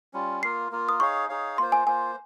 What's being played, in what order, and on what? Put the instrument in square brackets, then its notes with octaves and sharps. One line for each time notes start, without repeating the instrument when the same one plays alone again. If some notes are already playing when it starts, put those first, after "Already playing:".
[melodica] G3 C#4 F4
[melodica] A#3 F4 A#4 [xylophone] C7
[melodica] A#3 F4 A#4
[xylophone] D#6
[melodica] D#4 G#4 C#5 F5 [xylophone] C#6
[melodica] D#4 G#4 C#5 F5
[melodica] A#3 F4 C5 [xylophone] C6
[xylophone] G#5
[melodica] A#3 F4 C5 [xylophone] G#5